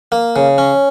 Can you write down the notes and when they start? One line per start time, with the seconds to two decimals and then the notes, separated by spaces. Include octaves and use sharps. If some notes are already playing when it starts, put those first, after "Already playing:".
0.12 A#3
0.36 C#3
0.58 C#4